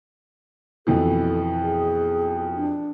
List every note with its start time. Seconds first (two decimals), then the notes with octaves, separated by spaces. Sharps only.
0.87 F2 B2 E3 A4
1.62 G#4
2.56 D4